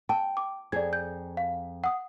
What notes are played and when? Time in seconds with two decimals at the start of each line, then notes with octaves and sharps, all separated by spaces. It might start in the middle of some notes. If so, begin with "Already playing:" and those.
0.09 G5 A5
0.37 D6
0.72 F2 G#4 D5 G#6
0.93 G6
1.37 F5
1.84 F#5 D#6